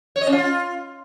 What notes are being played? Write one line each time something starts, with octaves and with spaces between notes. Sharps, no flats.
C#5
D#5
C#4
F4